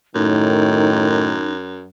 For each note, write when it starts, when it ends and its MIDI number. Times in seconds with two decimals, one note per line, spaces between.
0.15 1.87 42
0.15 1.35 45
0.15 1.43 51
0.15 1.51 63